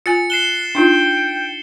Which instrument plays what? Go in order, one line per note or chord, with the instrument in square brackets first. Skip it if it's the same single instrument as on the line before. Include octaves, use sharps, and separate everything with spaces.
[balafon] F4 G#5 [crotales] A6 C#7
[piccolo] F#6 [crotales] C7 E7 G7
[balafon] D4 D#4 F4 [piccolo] G5